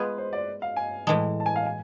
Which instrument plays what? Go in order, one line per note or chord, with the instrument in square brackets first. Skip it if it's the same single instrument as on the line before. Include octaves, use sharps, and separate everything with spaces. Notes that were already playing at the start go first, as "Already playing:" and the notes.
Already playing: [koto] G#3 B3 F4 G#4 [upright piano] B4
[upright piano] C5
D5
F5
G#5
[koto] A2 E3 G#3 [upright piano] A5
[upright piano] A5
G#5
F5
G#5